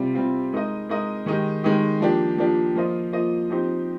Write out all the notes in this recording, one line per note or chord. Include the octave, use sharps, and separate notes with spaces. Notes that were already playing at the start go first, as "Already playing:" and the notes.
Already playing: C3 G3 C4 F4
C3 G3 C4 F4
G#3 D#4 A#4 D#5
G#3 D#4 A#4 D#5
D#3 G#3 D#4 G4
D#3 G#3 D#4 G4
F3 A#3 D4 G4
F3 A#3 D4 G4
F3 A#3 F4 C5 D#5
F3 A#3 F4 C5 D#5
F3 C4 D#4 G4 C5